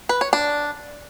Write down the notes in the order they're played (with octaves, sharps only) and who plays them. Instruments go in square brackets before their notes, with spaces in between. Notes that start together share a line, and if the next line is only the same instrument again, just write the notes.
[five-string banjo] B4
C#5
D4